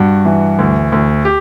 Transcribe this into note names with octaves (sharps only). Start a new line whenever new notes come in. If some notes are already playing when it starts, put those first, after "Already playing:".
Already playing: G2 F#4
E3
D2
D2
G4